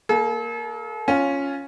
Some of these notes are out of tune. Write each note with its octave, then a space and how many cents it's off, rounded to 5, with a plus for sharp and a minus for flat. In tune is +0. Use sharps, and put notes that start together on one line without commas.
A#3 +0 A4 -45
C#4 +0 F4 +5